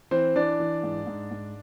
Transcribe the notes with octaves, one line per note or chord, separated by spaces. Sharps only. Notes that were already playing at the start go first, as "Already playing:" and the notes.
E3 C4 C5
E3 D4 D5
E3
G#2
G#2
G#2